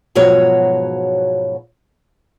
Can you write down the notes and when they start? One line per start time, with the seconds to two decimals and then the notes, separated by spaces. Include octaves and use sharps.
0.15 G#2 B2 F3 F#3 C#5 A#5